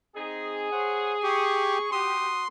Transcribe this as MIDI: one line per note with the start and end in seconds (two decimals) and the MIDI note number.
0.15 0.67 60
0.15 0.67 63
0.15 1.89 68
0.72 1.14 72
0.72 1.14 73
0.72 1.14 78
1.23 1.78 67
1.23 1.90 85
1.92 2.44 66
1.92 2.28 67
1.92 2.48 84
1.92 2.44 87